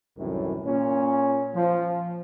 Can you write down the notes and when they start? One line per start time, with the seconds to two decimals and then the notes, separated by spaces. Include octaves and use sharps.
0.17 C2 F#2 A2 D#3 E3
0.65 A#2 C#4
1.54 F3